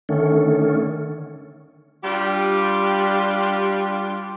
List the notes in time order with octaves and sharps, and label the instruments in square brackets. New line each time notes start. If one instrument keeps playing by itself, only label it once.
[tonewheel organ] D3 D#3 A3 C#4
[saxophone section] G3 D4 F4 G4